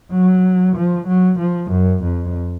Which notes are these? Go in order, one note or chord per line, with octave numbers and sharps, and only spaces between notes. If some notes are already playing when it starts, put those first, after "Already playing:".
F#3
F3
F#3
F3
F#2
F2